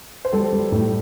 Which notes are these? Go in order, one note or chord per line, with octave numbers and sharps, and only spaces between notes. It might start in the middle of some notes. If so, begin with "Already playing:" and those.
C5
G3 A4
G3
A2